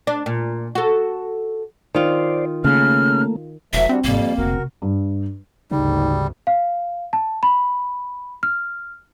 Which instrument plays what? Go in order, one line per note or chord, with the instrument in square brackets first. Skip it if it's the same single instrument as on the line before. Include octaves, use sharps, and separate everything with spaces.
[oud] D4
A#2
F#4 A4
[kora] D#3 F4 [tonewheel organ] C5 D5
[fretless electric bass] C#3 [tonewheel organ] A3 A#3 [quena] F6
[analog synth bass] F1 [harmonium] E3 F#3 A3 [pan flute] E5
[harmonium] G3 D4 F#4 [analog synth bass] C4
[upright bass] G#1 C3 [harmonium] F2 F3 G3 [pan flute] A#3
[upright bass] D4
[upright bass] F1 D3 [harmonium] F#4 A#4
[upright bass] C3
[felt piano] G2
[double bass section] G#1 D2 [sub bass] C#3 [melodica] G3 [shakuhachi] D#4
[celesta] F5
A5
B5
F6